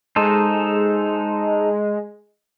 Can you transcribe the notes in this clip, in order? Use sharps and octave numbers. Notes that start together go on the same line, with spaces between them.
G#3 D#4 A4 C5